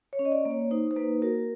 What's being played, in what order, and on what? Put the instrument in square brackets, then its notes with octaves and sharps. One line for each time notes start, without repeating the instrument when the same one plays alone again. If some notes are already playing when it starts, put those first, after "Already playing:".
[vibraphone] C#5
C#4
D#5
D5
A#3
C#5
D#4 C5
C5
A#3 B4
F#4 A#4